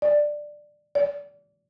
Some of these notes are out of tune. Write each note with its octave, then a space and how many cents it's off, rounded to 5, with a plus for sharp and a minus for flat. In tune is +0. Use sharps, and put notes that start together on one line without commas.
D5 +10
D5 -30